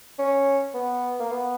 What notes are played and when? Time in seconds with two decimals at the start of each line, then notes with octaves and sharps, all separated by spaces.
0.19 C#4
0.74 B3
1.20 A#3
1.31 B3